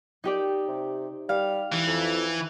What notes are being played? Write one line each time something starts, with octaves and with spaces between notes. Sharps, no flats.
D#4 G4 D5
C3
G3 F5
E3
F2